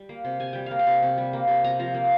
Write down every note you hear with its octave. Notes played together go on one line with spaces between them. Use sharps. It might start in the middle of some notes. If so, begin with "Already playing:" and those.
Already playing: G3
A#3
C3
C3 G#5
G3 G5
A#3 F5
G5
C3
C3
G3
A#3
C3
C3 A#5
F3 A#5
A#3